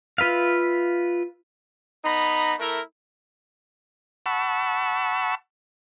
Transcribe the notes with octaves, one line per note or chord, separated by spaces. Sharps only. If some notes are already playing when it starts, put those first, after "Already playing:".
F4 B4 E5 F5
B3 D#4 A#5 B5
A3 E4 A#4
F#5 A5 B5 C#6 E6